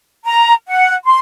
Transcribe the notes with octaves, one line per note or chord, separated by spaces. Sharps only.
A#5
F#5
C6